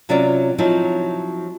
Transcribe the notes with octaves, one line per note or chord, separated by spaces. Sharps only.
C3 F#3 C#4 F4 D5
F3 F#3 C4 D#4 E4